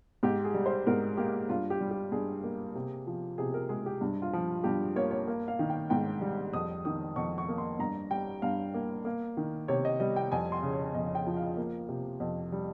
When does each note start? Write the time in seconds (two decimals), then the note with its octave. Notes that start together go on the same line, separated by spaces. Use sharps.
0.23 G#2 G4
0.44 G#4
0.54 G3
0.66 C5
0.87 G#2 A#4
1.17 A#3 G4
1.49 G2 F4
1.70 G4
1.81 G3
1.91 G4
2.12 G2 G#4
2.44 A#3
2.75 C3
3.07 F3
3.38 C3 G#4
3.54 A#4
3.69 G#3 G#4
3.86 G4
4.01 G2
4.22 F4
4.33 F3
4.64 G2 G4
4.96 A#3 C#5
5.11 C#5
5.28 A#3
5.48 F5
5.59 D#3
5.70 G5
5.90 G#2 G5
6.21 G3
6.53 F2 D#6
6.85 D#3 D#6
7.16 F2 C#6
7.38 C#6
7.48 A#3
7.58 C6
7.79 G2 A#5
8.11 G3 G5
8.42 G2 F5
8.74 A#3
9.05 A#3
9.37 D#3
9.68 C3 C#5
9.85 D#5
10.00 G3 D#5
10.16 G5
10.32 F2 G#5
10.52 C6
10.62 C#3
10.73 C#5
10.94 F2 D#5
11.15 G5
11.27 F3
11.37 F5
11.57 A#3
11.89 C3
12.20 F2
12.52 G3